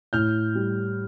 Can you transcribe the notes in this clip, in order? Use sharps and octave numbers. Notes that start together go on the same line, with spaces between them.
A2 F6 G6
G3